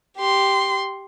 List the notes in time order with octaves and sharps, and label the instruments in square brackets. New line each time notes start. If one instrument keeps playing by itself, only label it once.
[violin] G4 C6